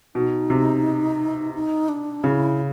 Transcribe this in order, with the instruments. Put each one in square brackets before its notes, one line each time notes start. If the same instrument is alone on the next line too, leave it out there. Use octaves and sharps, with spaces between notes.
[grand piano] B2 [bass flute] D#4
[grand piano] C3
[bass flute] D#4
D4
[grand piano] C#3 [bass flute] E4